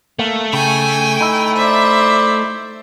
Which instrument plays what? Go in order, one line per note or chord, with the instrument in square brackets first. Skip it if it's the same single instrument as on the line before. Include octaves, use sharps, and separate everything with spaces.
[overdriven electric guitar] A3 [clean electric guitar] A#3
[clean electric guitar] C#3 [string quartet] G5 G#5
[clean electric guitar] D#4 E4
[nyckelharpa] C5 D5 [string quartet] E5